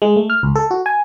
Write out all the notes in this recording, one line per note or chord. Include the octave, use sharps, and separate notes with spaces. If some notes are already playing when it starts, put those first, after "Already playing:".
G#3
A3
F6
C#2
A4
F#4
G#5